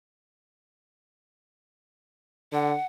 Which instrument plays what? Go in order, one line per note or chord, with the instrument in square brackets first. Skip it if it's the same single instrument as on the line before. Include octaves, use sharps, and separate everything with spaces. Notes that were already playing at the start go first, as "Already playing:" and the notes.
[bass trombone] D3 [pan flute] F#5